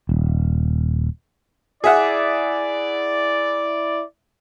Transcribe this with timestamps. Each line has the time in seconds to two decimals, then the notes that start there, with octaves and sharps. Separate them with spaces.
0.09 D#1
1.84 E4 G#4 D5 E5 F#5